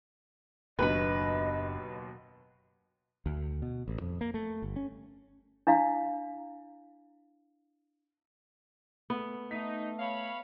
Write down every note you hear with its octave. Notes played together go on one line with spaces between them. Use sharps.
F#1 D#2 B2 F#3 D4 B4 D#5 B5
D2
B2
A1
F2
A#3
A3
G1
C#4
D4 E4 F5
A3 B3
A3 D#4 B6
C#5 F5 B5